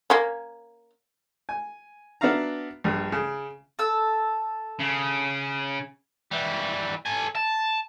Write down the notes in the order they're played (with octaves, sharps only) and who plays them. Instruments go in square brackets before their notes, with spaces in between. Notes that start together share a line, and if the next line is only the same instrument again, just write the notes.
[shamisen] A#3 C#4
[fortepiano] G#5
B3 D4 F#4 E5 F5 A#5
A#1 G2
C#3
[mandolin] A4 E6
[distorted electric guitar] C#3
[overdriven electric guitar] E3 G3
A4 G#5
A5